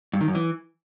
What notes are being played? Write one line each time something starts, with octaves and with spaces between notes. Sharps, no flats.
G2
D#3
F#2
E3